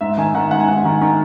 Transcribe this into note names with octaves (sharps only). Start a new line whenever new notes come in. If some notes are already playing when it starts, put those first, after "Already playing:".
G#2 E5
D#3 G#5
D#3 F#5
G#2 F#5
G#5
G#2 F#5
D#3
D#3